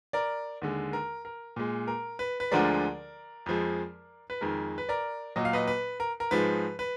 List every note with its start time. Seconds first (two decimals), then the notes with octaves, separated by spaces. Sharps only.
0.13 A#4 D5
0.62 D#2 D3 G#3
0.93 A#4
1.25 A#4
1.56 A#2 G#3
1.87 A#4
2.19 B4
2.40 B4
2.51 D2 D3 F3 G#3 A#4 D5
3.46 F2 F3 G#3
4.30 B4
4.41 F2 D#3 G#3 A#4
4.78 B4
4.89 A#4 D5
5.36 A#2 F#3 D#5
5.45 F5
5.53 B4 D#5
5.67 B4
6.00 A#4
6.20 A#4
6.31 G#2 F3 G#3 B4
6.79 B4